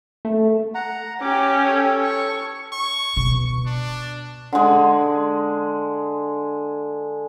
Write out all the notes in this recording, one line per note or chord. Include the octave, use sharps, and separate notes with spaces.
A3
F#5 A#5
C#4 G4 D6
A4 C#5
C#6
C#6
B2
D4
D3 G#3